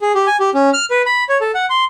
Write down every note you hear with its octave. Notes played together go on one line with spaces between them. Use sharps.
G#4
G4
G#5
G4
C#4
F6
B4
B5
C#5
A4
F#5
C6